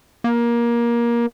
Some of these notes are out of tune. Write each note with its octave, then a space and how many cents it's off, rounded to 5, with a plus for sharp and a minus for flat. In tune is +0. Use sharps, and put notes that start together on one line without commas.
A#3 +20